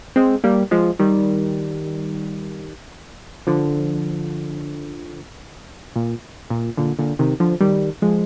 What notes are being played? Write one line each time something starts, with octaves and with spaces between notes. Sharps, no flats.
G#3 C4
G3 A#3
F3 G#3
D#3 G3
D3 F3
A#2
A#2
A#2 D3
A#2 D3
C3 D#3
D3 F3
D#3 G3
F3 G#3